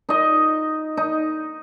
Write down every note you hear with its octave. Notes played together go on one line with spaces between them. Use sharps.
D#4 D#5
D#4